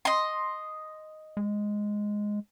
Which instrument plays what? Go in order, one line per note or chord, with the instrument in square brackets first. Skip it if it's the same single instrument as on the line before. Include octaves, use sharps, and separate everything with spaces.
[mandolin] D#5 C6
[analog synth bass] G#3